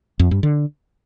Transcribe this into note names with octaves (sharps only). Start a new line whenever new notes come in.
F2
G2
D3